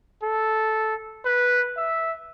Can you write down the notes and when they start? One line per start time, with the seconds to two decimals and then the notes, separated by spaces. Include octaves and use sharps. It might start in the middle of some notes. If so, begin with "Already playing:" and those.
0.23 A4
1.25 B4
1.77 E5